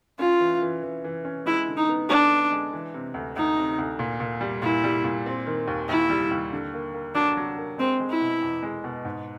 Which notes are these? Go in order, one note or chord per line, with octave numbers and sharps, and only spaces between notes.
C#4 F4
E3
E3
E3
E3
C#4
G#3 E4
D3
D#4
B3
D3 D4
B3
G#3
E3
C3
D2
D2 D#4
C3
D2
A#2
A#2
G3
A#2 E4
G3
A#2
C4
D#3
D#2
D#2 E4
G3
D#2
D3
A#3
A#3
F#3 D4
F#3
A#3
G#3 C4
G#3
E4
B2
E2
G#3
B2
G#2